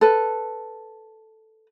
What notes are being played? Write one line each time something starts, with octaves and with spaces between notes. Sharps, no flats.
A4 B4